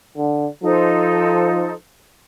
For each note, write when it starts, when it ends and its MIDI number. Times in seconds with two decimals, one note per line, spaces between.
0.17 0.46 50
0.62 1.74 53
0.62 1.72 63
0.62 1.72 69
0.62 1.72 72